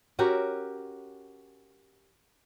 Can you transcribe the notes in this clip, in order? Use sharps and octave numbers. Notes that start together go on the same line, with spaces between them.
C#4 F#4 G4 A#4